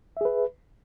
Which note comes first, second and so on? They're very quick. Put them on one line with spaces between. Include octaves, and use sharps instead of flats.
E5 G#4 B4